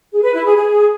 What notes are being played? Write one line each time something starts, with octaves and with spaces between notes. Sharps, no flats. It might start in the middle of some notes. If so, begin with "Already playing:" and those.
G#4
B4
E4
G#4
G#4